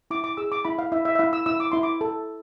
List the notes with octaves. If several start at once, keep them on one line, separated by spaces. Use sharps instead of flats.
E4 D6
D6
G#4 E6
D6
E4 B5
F5
E4 E5
E5
E5
E4 F5
E6
E4 E6
D6
E4 C6
D6
A4